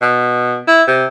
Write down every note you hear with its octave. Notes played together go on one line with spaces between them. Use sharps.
B2
E4
C3